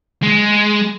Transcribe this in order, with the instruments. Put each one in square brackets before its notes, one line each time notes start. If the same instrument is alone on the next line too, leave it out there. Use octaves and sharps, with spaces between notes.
[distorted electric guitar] G#3